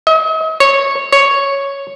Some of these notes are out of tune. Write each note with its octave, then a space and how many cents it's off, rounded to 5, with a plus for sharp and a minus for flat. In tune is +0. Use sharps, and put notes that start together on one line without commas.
D#5 +45
C#5 -10
C#5 +0